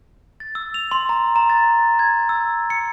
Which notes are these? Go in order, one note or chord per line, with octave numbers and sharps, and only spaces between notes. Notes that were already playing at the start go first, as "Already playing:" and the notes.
A6
E6
F7
C6
A#5
A#5
A6
G#6
E6
C#7